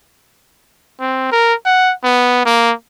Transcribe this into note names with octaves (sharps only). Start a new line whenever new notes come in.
C4
A#4
F#5
B3
A#3